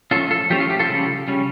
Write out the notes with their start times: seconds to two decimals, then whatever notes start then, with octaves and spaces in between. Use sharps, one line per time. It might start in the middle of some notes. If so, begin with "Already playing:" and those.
0.11 F3 A3 C#4 F4 A4
0.31 F4 A4
0.50 F3 A3 C#4 G4
0.60 F4
0.70 G4
0.79 F4 A4
0.89 C#3 G3 C#4
1.28 C#3 G3 C#4